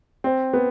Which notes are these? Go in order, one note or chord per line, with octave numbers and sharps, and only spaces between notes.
C4
B3